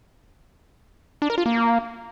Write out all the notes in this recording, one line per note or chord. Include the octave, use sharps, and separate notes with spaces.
D4
A#4
F4
A#3